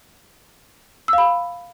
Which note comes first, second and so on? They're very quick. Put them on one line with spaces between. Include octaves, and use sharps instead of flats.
E6 F5 B5